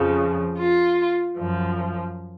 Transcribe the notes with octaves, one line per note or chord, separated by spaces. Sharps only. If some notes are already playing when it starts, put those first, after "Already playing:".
Already playing: F2 C#3 F3
F4
F#2 F3